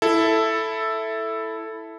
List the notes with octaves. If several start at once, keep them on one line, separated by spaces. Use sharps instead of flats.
E4 A4